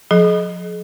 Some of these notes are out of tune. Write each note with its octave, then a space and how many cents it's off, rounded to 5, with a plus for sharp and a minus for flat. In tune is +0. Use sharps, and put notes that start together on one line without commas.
F3 +40 G#4 +40